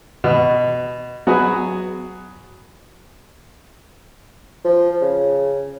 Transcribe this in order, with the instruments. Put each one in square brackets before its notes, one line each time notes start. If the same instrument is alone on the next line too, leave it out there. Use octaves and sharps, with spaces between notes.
[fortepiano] B2
F#3 B3 F#4 G#4
[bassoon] F3
C#3